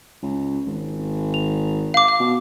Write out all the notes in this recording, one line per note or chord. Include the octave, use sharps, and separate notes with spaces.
C#2
G#1
F7
F5 D6
F5
B2